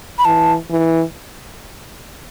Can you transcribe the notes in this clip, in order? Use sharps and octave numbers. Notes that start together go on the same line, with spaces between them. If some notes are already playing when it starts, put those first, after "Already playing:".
B5
E3 A5
E3